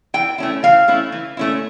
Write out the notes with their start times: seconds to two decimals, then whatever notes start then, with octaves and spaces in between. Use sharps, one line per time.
0.14 E3 G5
0.38 A3 C#4 E4
0.63 E3 F5
0.88 A3 C#4 E4
1.12 E3
1.37 A3 C#4 E4